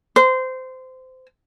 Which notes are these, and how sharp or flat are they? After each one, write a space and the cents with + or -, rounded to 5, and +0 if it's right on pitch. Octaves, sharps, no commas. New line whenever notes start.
C5 -20